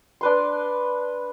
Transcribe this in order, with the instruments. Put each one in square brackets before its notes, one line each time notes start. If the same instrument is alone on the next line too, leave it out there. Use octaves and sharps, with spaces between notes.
[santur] D4 B4 C6